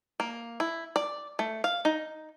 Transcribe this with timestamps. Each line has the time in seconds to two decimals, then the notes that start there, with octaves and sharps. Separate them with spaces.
0.20 A#3
0.60 E4
0.96 D5
1.39 A3
1.64 F5
1.85 D#4